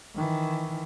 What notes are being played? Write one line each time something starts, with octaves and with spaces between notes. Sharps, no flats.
D#3 E3